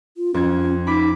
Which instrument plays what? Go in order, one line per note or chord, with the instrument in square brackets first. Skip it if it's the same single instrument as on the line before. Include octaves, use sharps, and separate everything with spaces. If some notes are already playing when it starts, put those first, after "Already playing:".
[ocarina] F4
[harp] F2 G#6 [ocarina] C#4
[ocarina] D#4 [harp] B5 D6 B6